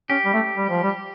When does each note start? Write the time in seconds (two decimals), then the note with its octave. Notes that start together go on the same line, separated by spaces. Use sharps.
0.10 C#4 G4
0.25 G3
0.33 A3
0.56 G3
0.69 F3
0.83 G3